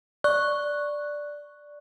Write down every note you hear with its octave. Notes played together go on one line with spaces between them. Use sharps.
D5 C#6 F#6